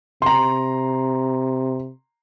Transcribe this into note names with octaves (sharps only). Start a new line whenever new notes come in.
C3 A#5 C6